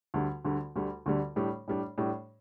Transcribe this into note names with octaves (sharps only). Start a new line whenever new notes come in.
D2 D3 G3
D2 D3 G3
D2 D3 G3
D2 D3 G3
A2 G3 D4
A2 G3 D4
A2 G3 D4